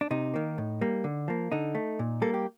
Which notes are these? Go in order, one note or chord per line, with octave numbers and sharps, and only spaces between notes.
D4
C3 D#4
D#3 A#3
A2
G3 A#3
D3
F3 A#3
D3 D#4
A3
A#2
G3 A#3 A4
G4